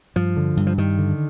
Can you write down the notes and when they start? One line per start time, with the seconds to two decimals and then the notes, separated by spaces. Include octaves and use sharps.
0.16 G2 F3
0.37 D3
0.57 G2
0.67 F3
0.78 G2 D#3
0.99 D3